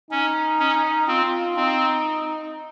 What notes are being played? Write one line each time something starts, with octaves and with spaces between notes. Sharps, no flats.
C#4 D#4
C#4
C4 F4
C4 D#4